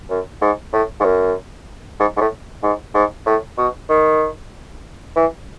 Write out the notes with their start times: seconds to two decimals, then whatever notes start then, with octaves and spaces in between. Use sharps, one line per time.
0.10 F#2
0.41 G#2
0.73 A2
1.00 G#2
1.04 F#2
2.00 G#2
2.17 G#2
2.21 A2
2.63 G#2
2.94 G#2
3.26 A2
3.58 B2
3.89 D#3
5.16 E3